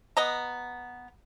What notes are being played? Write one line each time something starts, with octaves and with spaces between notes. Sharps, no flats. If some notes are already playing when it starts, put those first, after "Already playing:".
B3 D#5 A#5